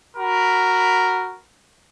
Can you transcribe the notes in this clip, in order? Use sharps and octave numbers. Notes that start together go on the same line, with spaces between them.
F#4 A#4 B5